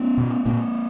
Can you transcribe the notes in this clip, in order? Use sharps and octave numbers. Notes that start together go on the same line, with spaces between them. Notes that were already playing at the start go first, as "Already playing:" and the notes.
Already playing: B3 C#4
B2
A#2 A#3 C4